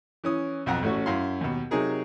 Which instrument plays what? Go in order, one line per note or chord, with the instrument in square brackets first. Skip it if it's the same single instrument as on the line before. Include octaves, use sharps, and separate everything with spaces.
[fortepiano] E3 C#4 D#6
B1 F2 F#5 A#5
A1 A3 C#4 F#4
F#2 E4 F5 C6
D#2 B2
C3 F#3 D#4 G#4 A#4